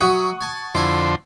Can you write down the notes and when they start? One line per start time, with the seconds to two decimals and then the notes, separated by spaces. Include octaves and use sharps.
0.01 F#3 E5 F#5 C#6 D#6
0.41 G#5 A5
0.75 F2 D3 E4 C5 G#5